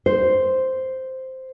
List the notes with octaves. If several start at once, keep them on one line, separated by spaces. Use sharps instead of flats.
C5